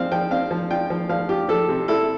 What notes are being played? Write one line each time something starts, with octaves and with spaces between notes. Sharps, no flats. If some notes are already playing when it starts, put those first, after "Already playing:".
Already playing: F3 C4 F5
F3 G5
C4 F5
F3
F4 G5
F3
F3 F5
F4 G4
F3 A4
C3
E4 A4